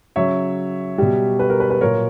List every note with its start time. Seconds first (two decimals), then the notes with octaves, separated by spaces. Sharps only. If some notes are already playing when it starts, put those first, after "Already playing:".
0.16 C#3 F#3 C#5 E5
0.98 B2 G3
1.39 B4
1.50 A#4
1.60 B4
1.70 B4
1.81 A#2 F#3 A#4 C#5